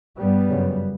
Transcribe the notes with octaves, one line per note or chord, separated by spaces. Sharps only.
G2 G3 B3
F#2 C#3